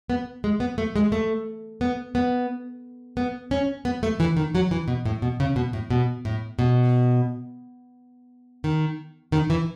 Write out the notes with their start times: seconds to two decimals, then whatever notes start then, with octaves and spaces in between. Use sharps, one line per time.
0.10 B3
0.44 G#3
0.60 B3
0.78 A3
0.96 G#3
1.12 A3
1.81 B3
2.15 B3
3.17 B3
3.51 C#4
3.85 B3
4.03 A3
4.20 E3
4.37 D#3
4.55 F#3
4.71 E3
4.88 B2
5.05 A2
5.22 B2
5.40 C#3
5.56 B2
5.73 A2
5.90 B2
6.25 A2
6.59 B2
8.64 D#3
9.32 D#3
9.50 E3